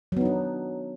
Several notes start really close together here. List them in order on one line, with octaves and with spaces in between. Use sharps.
F#3 B3 D#4 D4